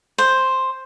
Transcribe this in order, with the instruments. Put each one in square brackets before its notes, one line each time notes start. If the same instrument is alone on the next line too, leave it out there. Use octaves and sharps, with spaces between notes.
[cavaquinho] C5